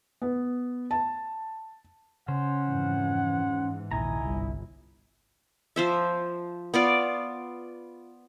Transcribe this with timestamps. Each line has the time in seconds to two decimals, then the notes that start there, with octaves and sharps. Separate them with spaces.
0.22 B3
0.91 A5
2.28 C#3 C#4 C5 F#5
2.67 F2 G#2 E3
3.43 G#2 E3
3.91 A#1 D#2 E4 D#5 G#5 A#5
4.22 G1 C2
5.76 F3 C5 E5
6.74 B3 F4 D5